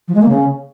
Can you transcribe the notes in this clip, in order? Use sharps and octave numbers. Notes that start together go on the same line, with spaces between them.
F3
G#3
A#3
C#3